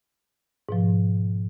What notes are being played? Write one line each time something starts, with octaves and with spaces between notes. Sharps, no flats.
G#2 B2 F3